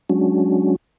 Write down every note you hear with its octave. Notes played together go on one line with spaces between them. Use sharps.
F#3 G#3 C#4 D4 F#4